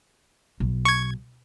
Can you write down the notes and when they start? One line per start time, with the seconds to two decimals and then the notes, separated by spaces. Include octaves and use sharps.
0.60 B1
0.85 C#6 G#6